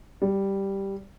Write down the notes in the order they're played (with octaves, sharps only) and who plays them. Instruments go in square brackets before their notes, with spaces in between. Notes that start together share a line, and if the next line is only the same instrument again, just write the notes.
[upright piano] G3